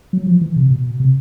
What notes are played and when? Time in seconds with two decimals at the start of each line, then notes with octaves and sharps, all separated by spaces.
0.13 F#3
0.26 F3
0.41 E3
0.56 C3
0.71 B2
1.00 C3